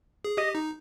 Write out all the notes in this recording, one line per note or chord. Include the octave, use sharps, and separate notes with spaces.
G#4
G4 D#5
D#4